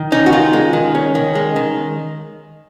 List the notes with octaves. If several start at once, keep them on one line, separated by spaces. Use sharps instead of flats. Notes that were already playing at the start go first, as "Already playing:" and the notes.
Already playing: D#3
C#4 D#4
F#4
D#3 F4
G#3
D#3
C#4
D#3
G#3
D#3